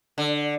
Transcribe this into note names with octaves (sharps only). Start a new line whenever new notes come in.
D3